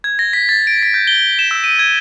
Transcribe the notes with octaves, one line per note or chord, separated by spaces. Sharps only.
G#6
A#6
B6
A6
D7
B6
G6
G7
E7
E6
D#7
G#6